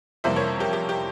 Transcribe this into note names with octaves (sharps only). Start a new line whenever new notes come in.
F2 C3 E3 G3 A#3 C5 E5
A#4 C#5
G4 A#4
G4 A#4
G4 A#4